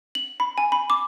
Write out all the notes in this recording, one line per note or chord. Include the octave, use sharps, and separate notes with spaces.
F#7
B5
G#5
B5
D6